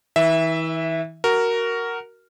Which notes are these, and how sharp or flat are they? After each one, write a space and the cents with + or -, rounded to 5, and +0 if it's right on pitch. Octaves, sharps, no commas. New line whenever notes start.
E3 -35 E5 +0
F#4 +15 A#4 -5